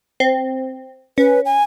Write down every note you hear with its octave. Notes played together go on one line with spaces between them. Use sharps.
C4
C#4 B4
G#5